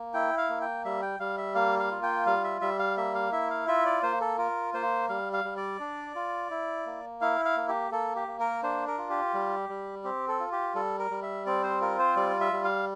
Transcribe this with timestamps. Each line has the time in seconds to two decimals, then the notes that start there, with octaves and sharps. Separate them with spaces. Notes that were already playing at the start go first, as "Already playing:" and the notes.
Already playing: A#3
0.14 E4 G5
0.38 F5
0.49 A#3
0.61 G5
0.85 G3 E5
1.02 G5
1.20 G3 F5
1.38 E5
1.55 A#3 F5
1.79 F5
1.91 F4
2.03 G5
2.26 G3 F5
2.44 E5
2.61 G3 E5
2.79 F5
2.97 A#3 E5
3.15 F5
3.32 E4 E5
3.50 F5
3.68 F4 E5
3.86 D5
4.03 A#3 C5
4.21 A4
4.38 F4 A#4
4.74 A#3 C5
5.09 G3 F5
5.33 F5
5.44 G3
5.57 D5
5.80 D4
6.15 F4
6.51 E4
6.86 A#3
7.21 E4 F5
7.45 F5
7.57 A#3
7.69 G4
7.92 A#3 A4
8.16 G4
8.28 A#3
8.40 A#4
8.63 D4 C5
8.87 A#4
8.98 F4
9.10 G4
9.34 G3
9.69 G3
10.04 C4 G4
10.28 A4
10.40 F4
10.52 G4
10.75 G3 A4
10.99 A#4
11.11 G3
11.22 E5
11.46 C4 D5
11.63 C5
11.81 F4 A#4
11.99 C5
12.16 G3 D5
12.41 E5
12.52 G3
12.64 F5